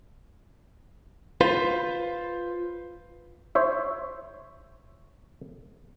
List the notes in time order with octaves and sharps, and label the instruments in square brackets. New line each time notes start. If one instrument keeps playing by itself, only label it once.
[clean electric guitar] F4 B4 C5
[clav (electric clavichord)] C5 C#5 E5